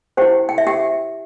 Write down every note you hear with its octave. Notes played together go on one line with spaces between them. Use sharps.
E4 G4 C5 G5
G5
E5
G4 G5